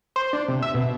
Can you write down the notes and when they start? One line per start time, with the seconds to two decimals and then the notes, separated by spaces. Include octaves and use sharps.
0.16 C5
0.33 D4
0.48 C3
0.62 E5
0.74 B2